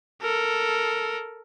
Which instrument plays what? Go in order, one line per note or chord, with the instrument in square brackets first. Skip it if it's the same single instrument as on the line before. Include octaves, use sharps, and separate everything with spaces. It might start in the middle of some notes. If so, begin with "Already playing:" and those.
[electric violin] A4 A#4